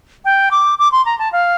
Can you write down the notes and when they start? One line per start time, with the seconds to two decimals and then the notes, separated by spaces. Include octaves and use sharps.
0.25 G5
0.51 D6
0.79 D6
0.92 C6
1.05 A#5
1.19 A5
1.33 F5